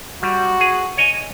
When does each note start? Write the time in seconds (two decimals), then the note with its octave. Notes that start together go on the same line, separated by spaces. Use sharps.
0.23 G3 F#4
0.60 G#4
0.97 C#5 D#5 G#5